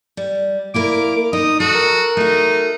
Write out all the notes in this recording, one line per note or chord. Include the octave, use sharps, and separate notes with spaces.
G3
A#3 E4 A#4 D6
D#4 D#6
F#4 A4
A#4
A3 D#4 F#4